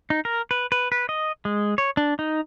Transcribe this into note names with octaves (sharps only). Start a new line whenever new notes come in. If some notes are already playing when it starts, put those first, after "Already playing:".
D#4
A#4
B4
B4
B4
D#5
G#3
C#5
D4
D#4